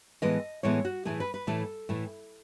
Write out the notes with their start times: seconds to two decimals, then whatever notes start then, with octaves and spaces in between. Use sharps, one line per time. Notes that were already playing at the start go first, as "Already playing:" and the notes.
0.22 A2 E3 G#3 B3 D#5
0.63 A2 E3 G#3 B3 C#5
0.85 F#4
1.05 A2 E3 A3 G#4
1.20 B4
1.34 B4
1.47 A2 E3 A3 A4
1.89 A2 E3 A3